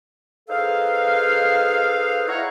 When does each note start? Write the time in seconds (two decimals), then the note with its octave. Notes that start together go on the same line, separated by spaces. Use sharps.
0.48 D#4 G#4 A4 B4 C5 F5
2.28 E4 C#5 F#5 A#5